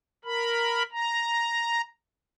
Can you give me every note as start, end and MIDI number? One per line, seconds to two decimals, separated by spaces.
0.24 0.83 70
0.24 0.83 83
0.92 1.81 82